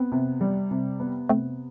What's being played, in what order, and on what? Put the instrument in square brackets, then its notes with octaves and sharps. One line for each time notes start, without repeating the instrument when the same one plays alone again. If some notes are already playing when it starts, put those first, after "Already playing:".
Already playing: [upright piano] B3 [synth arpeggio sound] C4
[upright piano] C3
G3
C3
B3
[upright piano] C3 [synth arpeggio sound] A3 C4